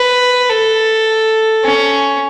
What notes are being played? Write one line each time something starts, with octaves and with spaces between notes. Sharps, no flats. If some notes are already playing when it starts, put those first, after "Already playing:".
Already playing: B4
A4
C#4